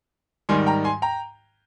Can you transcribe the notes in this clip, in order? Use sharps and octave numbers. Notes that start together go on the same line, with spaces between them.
G#2 D#3 G3 G#5 C6
G5 A#5
G#5 C6
G5 A#5